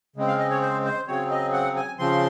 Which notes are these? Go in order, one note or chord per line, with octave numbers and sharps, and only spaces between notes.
C#3 G#3 C4
F5
D#5
C#5
C5
C5
C#3 F#3 C4 C#5
D#5
F#5
G#5
C#3 F3 C4 C6